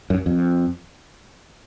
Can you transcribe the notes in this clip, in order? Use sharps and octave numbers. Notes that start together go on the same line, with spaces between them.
F#2
F2